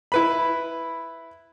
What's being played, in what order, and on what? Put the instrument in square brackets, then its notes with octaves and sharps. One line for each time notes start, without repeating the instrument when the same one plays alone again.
[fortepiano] E4 B4 B5